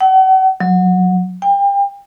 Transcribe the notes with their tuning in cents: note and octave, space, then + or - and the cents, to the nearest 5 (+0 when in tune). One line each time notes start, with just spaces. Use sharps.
F#5 +40
F#3 -15
G5 +30